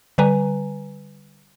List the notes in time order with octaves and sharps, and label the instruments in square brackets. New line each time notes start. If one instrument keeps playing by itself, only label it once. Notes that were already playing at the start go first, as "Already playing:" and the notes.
[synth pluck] D3 G3 B4 G#5 A#5